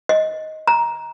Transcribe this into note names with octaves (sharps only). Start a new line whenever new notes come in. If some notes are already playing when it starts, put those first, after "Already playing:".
D#5
A#5